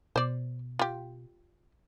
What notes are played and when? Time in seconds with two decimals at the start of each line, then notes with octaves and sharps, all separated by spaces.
0.16 B2 C5 D5
0.79 F4 G4